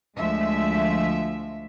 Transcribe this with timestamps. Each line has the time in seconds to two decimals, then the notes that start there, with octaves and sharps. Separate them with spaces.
0.17 D2 F3 G#3 E5